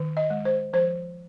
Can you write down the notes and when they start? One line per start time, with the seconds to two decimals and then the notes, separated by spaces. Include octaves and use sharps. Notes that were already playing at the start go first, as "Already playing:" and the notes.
Already playing: D#3
0.17 D#5
0.30 G#3
0.45 C5
0.73 F3 C5